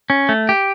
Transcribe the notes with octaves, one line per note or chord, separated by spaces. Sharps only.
C#4
A3
G4